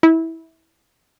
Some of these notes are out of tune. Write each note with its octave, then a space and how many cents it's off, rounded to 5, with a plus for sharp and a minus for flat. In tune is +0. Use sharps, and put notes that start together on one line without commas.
E4 -20